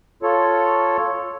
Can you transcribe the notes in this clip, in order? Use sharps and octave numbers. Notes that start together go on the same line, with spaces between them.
F4 A4 C#5